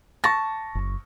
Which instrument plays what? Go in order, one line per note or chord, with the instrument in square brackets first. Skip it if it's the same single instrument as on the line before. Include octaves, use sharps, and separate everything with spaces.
[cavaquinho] A5 [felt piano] C#6 A#6
[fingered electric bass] F#1